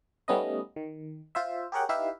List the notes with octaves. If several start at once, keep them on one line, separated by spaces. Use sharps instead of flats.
G3 A3 B3 C#4 D#4 D#5
D#3
F4 C5 E5
G4 G#4 A#4 C#5 F#5 G5
D#4 E4 G4 B4 E5 F5